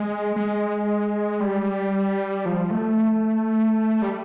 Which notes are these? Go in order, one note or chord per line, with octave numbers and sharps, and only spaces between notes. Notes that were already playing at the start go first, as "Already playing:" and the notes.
Already playing: G#3
G#3
G3
F3
A3
G3